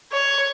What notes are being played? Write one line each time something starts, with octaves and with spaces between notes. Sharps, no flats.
C#5